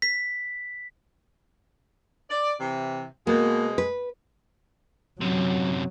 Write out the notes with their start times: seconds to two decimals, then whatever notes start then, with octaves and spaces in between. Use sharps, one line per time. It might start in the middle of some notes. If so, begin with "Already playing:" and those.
0.02 B6
2.29 D5
2.60 C3 E3
3.27 B2 G#3 A#3
3.78 B4
5.21 F#2 C3 F#3